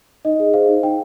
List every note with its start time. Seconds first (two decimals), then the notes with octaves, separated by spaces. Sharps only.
0.25 D#4 D#5
0.40 G#4
0.53 C5 F5
0.69 D#4
0.83 D#4 G5